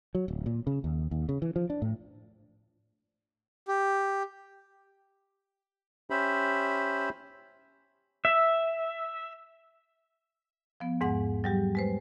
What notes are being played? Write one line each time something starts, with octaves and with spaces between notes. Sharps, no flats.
F#3
D1
A#2
C#3
D#2
D#2
C#3
E3
F3
D4
A2
G4
C#4 G4 C5 E5 B5
E5
F3 B3
E2 G#2 G#3 F#5
F#3 G3 G4
G#3 B4 C5